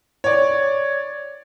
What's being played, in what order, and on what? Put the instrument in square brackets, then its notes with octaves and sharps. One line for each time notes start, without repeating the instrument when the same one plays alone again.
[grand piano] C#5 D5